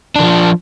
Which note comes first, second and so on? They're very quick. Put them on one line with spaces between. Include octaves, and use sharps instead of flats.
D4 E3 F3